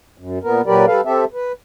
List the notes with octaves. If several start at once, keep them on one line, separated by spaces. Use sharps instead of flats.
F#2
A#2 B3 A#4
A#2 F#3 G4 A#4 B4 D5
G3 A4 B4 F5
C4 G4 A4 E5
B4